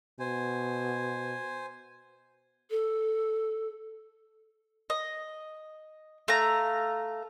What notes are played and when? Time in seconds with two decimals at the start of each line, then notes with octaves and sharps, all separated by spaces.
0.19 B2 C5 G#5
2.71 A4
4.90 D#5
6.28 A3 F5 A#5